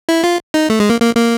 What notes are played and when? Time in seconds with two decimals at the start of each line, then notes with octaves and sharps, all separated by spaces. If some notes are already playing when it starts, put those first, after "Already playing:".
0.09 E4
0.24 F4
0.54 D#4
0.70 A3
0.80 G#3
0.90 A#3
1.01 A#3
1.15 A#3